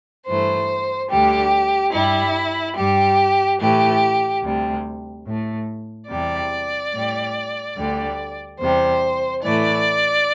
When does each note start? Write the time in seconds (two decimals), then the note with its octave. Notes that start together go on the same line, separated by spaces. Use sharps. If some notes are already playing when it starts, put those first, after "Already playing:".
0.27 G2 E3 A3 C5
1.10 D2 D3 G3 G4
1.94 G2 G3 E4
2.77 G2 G3 G4
3.60 A2 E3 A3 G4
4.44 D2 C3 G3
5.27 A2 A3
6.10 E2 C3 G3 D5
6.94 A2 G3
7.76 D2 D3 G3
8.60 E2 C3 G3 C5
9.43 A2 E3 A3 D5